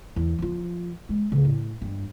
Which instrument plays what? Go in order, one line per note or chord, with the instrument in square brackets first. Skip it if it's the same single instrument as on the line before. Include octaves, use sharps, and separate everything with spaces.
[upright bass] E2
F3 F4
G#3
D2 C#3
A2
G2